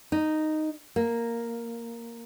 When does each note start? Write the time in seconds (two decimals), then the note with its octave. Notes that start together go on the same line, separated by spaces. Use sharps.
0.12 D#4
0.96 A#3